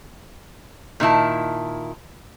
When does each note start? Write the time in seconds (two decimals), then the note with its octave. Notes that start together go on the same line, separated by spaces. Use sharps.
1.00 A#2 D#3 E4 A5